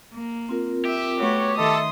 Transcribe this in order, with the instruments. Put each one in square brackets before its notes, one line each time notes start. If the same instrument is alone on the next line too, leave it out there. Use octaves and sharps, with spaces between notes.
[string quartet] A#3
[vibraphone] C4 F4 A#4
[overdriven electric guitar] G4 [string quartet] E5
[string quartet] A3 B3 F#4 [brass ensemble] C#5
[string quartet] D#3 C6 D#6 [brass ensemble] A4 [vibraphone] D#5 E5